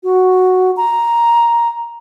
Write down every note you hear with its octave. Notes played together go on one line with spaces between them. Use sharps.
F#4
A#5